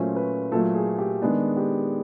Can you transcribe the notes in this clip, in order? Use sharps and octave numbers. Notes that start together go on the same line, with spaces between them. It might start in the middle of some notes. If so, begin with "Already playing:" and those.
Already playing: A#2 F#3 A3 C#4 C5
B4
A#2 F#3 A3 A4
G#4
G4
D#3 G#3 B3 D4 G#4
G4